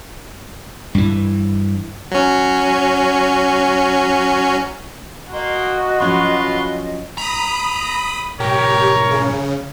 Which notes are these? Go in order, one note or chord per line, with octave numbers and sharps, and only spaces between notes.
G2 E3
F#3 C#4
A#3 F#4 D#5 C6
F3 F#3 C#4 F4 B4 C6
A#5 B5 D#6
B1 G#2 G4 A#4 C#5
C#3